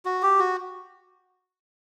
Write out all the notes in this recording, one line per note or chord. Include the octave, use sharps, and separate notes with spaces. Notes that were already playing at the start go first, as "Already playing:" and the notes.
F#4
G4
F#4